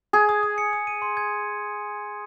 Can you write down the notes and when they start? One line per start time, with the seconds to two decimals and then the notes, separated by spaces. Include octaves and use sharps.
0.13 G#4 G#6
0.29 D#6
0.43 D#6
0.58 C#7
0.73 D#6
0.87 D#7
1.02 C6
1.17 G#6